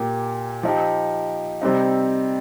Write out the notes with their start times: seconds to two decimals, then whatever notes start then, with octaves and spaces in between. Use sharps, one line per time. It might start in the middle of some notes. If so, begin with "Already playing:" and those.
Already playing: A#2 A#3 G4
0.63 F3 D#4 G4
1.62 C3 G3 C4 D#4